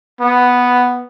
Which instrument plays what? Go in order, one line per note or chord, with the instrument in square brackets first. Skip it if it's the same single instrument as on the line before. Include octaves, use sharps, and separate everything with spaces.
[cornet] B3